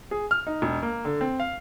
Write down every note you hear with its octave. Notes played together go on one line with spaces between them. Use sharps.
G#4
F6
D#4
E1
A#3
D3
C4
F5